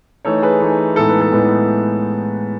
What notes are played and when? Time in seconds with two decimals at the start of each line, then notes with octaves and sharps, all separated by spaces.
0.25 E3 A3 D#4 A4 C#5
0.42 G#4 B4
0.60 E3 A3 D#4
0.96 A2 E3 G#3 B3 D#4 A4
1.09 B4
1.21 A4
1.32 A2 E3 G#3 B3 D#4